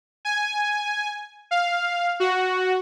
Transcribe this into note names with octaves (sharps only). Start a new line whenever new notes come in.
G#5
F5
F#4